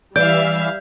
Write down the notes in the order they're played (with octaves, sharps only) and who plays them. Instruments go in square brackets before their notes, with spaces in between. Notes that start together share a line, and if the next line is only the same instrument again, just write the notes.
[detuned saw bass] E3 [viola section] G3 E5 F5 [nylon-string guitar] D5 [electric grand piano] G6